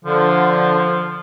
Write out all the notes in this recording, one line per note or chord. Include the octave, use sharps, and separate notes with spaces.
D3 F3